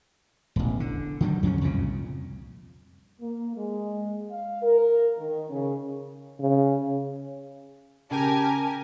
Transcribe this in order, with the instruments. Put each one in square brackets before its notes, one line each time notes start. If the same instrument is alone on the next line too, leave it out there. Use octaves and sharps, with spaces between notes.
[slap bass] E1 A1
D3
D3 D#3 F#3 G3
F2 F#3 C4 C#4
C2 F2 A#2 C#3
[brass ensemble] A#3
G#3
F5
A#4
D#3
C#3
[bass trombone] C#3
[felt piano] C#3 [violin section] G4 A#4 G#5 [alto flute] A5